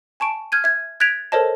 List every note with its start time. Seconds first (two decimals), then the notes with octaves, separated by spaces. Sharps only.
0.20 G#5 A5 C#6 D7
0.52 F6 G6 G#6 D#7
0.64 E5 G#6
1.00 F#6 G#6 A6 B6 D7 F7
1.32 A4 A#4 C5 C#5 D#5 A5